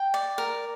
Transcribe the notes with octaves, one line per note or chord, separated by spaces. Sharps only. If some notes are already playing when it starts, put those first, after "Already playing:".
Already playing: G5
D5
A#4